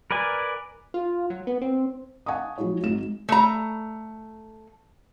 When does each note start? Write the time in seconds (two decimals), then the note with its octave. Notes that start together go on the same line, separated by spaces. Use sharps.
0.11 A#4 B4 D5 G#5
0.94 F4
1.30 F#3
1.47 B3
1.61 C4
2.26 F5 F#5 G#5 A5 C#6 D#6
2.58 F3 F#3 G#3 E4 F#4 C#5
2.83 G#1 G#2 F#3 G#3 G#4 E7
3.29 A3 A#5